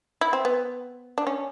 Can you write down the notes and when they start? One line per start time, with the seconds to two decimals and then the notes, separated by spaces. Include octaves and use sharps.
0.21 E4
0.33 C4
0.45 B3
1.18 D4
1.27 C#4